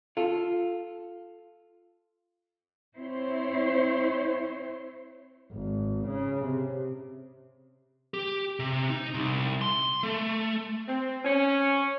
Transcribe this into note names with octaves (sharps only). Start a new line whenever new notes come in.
F4 A4
C4 E4 C5 C#5
G#1
C#3
C3
G4
C3
D#4
C2
C6
A3
C4
C#4